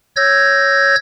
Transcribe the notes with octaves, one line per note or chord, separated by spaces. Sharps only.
C#5 E6 G6 G#6 A#6